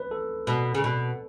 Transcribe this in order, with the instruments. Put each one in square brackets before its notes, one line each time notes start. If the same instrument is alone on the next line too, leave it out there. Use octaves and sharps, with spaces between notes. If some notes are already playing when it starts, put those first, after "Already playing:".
Already playing: [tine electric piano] B4
A4
[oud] B2
C#3
B2